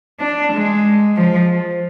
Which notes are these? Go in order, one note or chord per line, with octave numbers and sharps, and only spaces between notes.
D4
G#3
F3